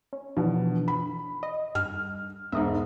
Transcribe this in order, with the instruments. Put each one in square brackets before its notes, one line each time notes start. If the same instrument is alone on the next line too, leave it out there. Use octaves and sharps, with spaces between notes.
[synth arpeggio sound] C#4
[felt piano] B2 [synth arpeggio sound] E3 F3 D4
[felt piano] B5
[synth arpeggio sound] D#5
[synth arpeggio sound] G2 [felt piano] F6
[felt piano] E1 G#2 [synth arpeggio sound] D#5 E5